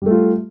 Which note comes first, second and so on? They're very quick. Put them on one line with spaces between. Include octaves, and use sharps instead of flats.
G3 A3 F4